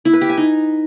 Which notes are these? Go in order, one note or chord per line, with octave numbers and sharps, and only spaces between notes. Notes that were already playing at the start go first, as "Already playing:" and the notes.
E4
B4
G4
G#5
D#4